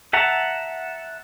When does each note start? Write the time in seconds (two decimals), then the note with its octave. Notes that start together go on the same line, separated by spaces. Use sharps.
0.13 E5 F#5 A5 A#5